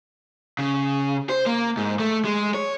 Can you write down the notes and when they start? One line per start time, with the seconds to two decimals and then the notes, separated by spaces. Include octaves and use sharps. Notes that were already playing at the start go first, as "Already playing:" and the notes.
0.59 C#3
1.29 C5
1.46 A#3
1.77 G#2
1.99 A3
2.25 G#3
2.54 C#5